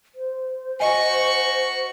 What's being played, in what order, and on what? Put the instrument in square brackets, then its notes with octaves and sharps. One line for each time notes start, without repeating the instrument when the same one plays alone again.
[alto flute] C5
[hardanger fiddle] F#4 C#6 [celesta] D#5 G#5